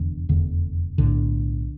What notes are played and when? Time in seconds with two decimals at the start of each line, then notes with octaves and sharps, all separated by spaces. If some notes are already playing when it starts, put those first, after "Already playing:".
Already playing: F1 E2 D3
0.29 F1 E2 D3
0.98 B1 A2 D3